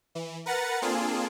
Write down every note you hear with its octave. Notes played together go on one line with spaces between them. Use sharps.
E3
A#4 B4 F#5 A#5 A6 C#7
A#3 C4 D4 F4 G#4 A4